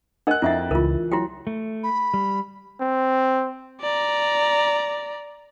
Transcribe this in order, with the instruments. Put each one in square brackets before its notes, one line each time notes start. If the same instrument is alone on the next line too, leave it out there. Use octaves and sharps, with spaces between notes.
[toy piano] D4 A#4 D#5 [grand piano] F#5 F#6
[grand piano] F2 A6 [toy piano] E4 E5 F#5
[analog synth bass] C#2 [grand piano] E3 [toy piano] F4 A#4
[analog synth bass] F#3 [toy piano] E4 F#4 G5
[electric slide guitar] A3
[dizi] B5
[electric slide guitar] G3
[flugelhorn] C4
[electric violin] D5 A#5